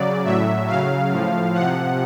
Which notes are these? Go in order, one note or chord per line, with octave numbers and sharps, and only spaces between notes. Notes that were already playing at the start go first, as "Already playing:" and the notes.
Already playing: C#3 F#3 D5
A2 F#3 E5
C#3 F#3 F5
A2 F3
C3 F3 F#5